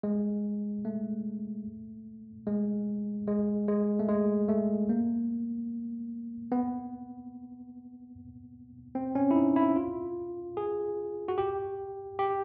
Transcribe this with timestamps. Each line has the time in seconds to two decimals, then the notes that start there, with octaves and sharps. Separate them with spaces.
0.03 G#3
0.85 A3
2.47 G#3
3.27 G#3
3.68 G#3
3.99 A3
4.09 G#3
4.49 A3
4.89 A#3
6.52 B3
8.95 C4
9.15 C#4
9.31 E4
9.35 D#4
9.56 E4
9.76 F4
10.57 G#4
11.28 F#4
11.38 G4
12.19 G4